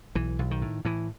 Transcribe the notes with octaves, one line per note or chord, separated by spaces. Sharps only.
B1 E3
B1
D#3
A2
A2 E3